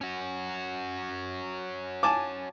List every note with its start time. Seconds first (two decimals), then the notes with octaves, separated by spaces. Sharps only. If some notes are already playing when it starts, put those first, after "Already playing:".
0.01 C#4 F#4
2.03 G#5 A5 D6